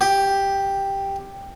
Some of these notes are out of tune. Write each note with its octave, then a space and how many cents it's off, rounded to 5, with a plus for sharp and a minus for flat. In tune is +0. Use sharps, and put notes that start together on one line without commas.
G4 +5